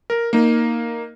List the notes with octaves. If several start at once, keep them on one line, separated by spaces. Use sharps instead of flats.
A#4
A#3 D#4